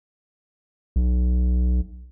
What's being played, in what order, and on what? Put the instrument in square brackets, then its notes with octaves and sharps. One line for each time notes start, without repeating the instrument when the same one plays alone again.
[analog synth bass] B1